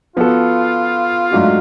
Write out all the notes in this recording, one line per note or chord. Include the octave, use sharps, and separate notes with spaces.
F3 B3 F4 F#4 A4
G#2 F#3 A3 D4 F#4